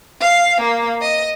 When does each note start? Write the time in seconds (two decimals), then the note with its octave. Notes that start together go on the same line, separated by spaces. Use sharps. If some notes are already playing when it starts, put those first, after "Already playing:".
0.20 F5
0.59 A#3
1.01 D#5